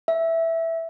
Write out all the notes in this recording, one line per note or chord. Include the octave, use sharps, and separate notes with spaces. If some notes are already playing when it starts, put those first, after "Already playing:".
E5